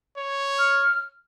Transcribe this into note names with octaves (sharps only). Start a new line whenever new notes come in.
C#5
F6